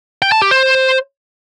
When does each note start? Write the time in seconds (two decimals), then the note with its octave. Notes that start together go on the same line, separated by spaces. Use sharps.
0.22 G5
0.32 A5
0.42 G4
0.51 C5